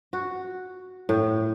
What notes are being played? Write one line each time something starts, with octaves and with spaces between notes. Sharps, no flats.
F#4
A2